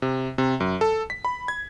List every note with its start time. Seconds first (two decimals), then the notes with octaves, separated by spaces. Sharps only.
0.02 C3
0.38 C3
0.60 F#2
0.81 A4
1.10 B6
1.25 B5
1.48 G#6